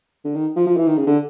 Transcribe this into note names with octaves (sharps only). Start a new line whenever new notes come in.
D3
D#3
F3
F3
E3
D#3
C#3
D3